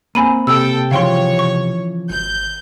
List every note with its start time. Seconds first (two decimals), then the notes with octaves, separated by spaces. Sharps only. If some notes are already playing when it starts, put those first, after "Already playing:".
0.15 A#3 C4 G#5 A#5 B5 D#7
0.47 C3 A4 G5 E6
0.91 C#3 E3 F3 C#5 F5 G5 C6
1.39 C#6
2.10 G#1 G6